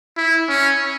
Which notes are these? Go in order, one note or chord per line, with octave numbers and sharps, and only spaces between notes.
E4
C#4